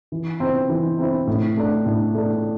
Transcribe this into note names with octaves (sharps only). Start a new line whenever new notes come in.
E3
C4 E4
E3
C4 E4
A2
A3 D4
A2
A3 D4